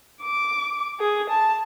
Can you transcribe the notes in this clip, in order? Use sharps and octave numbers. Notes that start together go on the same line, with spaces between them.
D6
G#4
A5